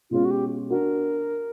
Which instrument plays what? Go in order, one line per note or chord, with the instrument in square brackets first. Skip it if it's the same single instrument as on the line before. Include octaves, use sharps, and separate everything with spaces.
[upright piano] B2 G#3 C#4 [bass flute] F4
[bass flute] F#4
G4
[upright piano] D4 F#4 [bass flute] A#4